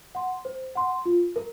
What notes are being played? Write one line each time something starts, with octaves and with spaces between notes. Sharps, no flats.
F#5 C6
C5
F#5 C6
F4
A#4